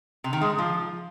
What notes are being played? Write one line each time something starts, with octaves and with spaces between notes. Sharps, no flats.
C3
D#3
G#3
G#2
F3